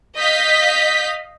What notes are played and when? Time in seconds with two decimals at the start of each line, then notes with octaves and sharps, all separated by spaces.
0.17 D#5 F5 G6 B6